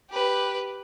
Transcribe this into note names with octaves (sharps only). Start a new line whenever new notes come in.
G4 B4